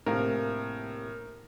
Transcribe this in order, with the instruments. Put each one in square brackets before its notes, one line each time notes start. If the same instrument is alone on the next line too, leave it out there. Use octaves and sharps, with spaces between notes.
[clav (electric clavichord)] A#1 C3 F5 [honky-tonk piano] A2 [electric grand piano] A#4